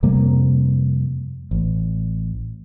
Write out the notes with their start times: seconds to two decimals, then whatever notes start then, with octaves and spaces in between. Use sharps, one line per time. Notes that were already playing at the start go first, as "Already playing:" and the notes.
0.03 F2 C3 G3 A#3
1.51 A1